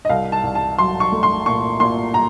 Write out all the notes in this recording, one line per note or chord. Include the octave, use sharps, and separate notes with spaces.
D#5
C2 F5
A5
C2
A5
F#3 C6
C#6
A3
C6
A#2 C#6
A#2 C6
A#5